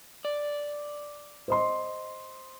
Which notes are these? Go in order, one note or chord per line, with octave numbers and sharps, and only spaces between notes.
D5
C5 D#5 C6